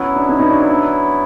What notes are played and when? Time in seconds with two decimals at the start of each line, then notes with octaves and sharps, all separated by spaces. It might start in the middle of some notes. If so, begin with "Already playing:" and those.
Already playing: F#3 B3 C#4 E4
0.16 D4
0.29 C#4 D#4
0.39 C#4 D#4
0.50 D4
0.60 D4
0.71 D4